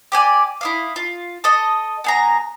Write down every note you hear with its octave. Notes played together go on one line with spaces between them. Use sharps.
G4 D5 G#5
E4 D#5 F5
F4
A4 D#5
B3 G#4 A#5